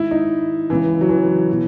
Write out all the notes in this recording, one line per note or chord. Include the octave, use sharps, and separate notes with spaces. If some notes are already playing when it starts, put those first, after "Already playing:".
Already playing: G#2 D#3 E4
D#4
C#2 C#3 E3
F#3
E3
B2